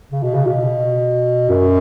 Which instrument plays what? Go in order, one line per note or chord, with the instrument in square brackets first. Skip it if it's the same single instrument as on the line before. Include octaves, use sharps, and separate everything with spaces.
[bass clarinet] C#3
B2
C#3
B2
F#2